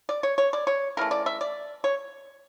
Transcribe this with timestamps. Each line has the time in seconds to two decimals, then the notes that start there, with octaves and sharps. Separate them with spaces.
0.09 D5
0.23 C#5
0.38 C#5
0.53 D5
0.67 C#5
0.97 C#3 E3 A3 A#4
1.11 D5
1.26 E5
1.41 D5
1.84 C#5